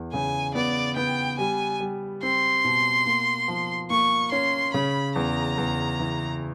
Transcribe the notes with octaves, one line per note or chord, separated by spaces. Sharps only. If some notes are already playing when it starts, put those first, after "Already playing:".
Already playing: E2
C#3 G#5
B3 D5
B3 G5
G3 G#5
G3
C4 C6
B2
A#3
F3
A#3 C#6
C#4 C6
C#3 B5
E2 A#5
E2
E3